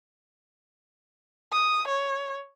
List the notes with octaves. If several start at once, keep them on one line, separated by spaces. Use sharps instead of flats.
D#6
C#5